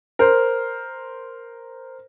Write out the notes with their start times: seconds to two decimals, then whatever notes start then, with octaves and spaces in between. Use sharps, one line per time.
0.19 A#4 C5